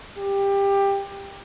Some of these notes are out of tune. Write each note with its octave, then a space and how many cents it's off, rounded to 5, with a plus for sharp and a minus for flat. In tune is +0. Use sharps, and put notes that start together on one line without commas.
G4 +15